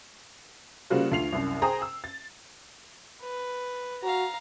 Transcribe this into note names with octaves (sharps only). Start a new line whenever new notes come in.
C#3 G3 A#3 F4 F#4 C5
D2 F4 C7 F7
C2 F#2
G#4 C5 G5 A#5 D#6
E6
A6
B4
F#4 F5 A#5